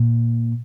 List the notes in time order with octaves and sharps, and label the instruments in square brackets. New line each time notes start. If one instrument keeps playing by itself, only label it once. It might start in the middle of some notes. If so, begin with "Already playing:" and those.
Already playing: [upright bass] A#2